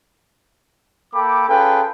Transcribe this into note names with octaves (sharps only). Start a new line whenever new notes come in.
A#3 A4 G5 B5 D6
C#4 F4 G#4 A4 B4 G5